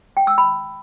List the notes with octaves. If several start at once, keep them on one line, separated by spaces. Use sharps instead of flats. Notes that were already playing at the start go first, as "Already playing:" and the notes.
G5
E6
B5